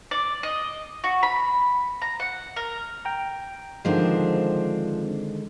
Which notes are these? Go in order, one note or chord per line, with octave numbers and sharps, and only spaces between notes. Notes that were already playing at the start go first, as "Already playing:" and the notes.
D5
D#5
F#4
B5
A#5
F#5
A#4
G5 A#5
D3 D#3 F3 G#3 C4 D4